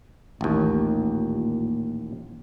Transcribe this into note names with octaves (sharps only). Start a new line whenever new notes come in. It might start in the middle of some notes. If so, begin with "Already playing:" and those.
A1 D#2 A#2